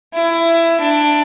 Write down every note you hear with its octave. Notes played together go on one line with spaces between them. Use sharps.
E4
D4